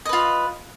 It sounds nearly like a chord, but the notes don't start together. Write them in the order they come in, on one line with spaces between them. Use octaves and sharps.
D#5 B4 F4